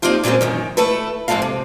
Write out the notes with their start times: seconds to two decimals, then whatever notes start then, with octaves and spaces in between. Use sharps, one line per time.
0.02 A#3 C4 D4 D#4 F4 G4
0.24 A#2 F#3 G#3 C4 C#4
0.41 F#2 D#3 E3
0.77 A3 E4 A4 B4
1.28 F2 G#2 G#3 C4 A4 F5
1.42 C3